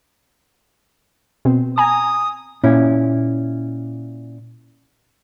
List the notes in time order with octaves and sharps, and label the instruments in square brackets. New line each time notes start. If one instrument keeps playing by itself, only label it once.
[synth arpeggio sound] B2 C4
[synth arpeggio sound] G#5 A#5 [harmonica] D#6
[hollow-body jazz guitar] A#2 C#4 E4